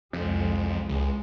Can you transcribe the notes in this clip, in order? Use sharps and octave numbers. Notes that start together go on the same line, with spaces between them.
C2 F2 G#3
C#2 G#3